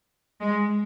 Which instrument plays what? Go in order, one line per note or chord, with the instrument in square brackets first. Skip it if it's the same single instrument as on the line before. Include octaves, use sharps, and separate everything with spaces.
[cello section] G#3